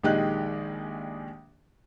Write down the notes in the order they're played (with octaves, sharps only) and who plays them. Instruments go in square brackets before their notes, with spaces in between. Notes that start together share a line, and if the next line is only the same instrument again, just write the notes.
[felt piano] A#1 D#3 G#3 G4 D#5 F#6